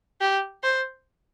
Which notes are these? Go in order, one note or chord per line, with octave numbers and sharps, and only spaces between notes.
G4
C5